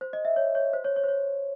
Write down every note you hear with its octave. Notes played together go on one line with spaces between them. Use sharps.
C5
D#5
E5
C#5
C#5
C5
C#5
C#5
C5
C#5